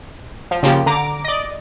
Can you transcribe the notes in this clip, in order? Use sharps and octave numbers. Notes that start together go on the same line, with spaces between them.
F3
C#3 F3 A#3 G4
D3 A#5 D6
D5 D#5